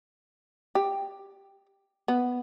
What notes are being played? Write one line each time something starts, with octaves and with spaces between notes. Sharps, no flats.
G4
B3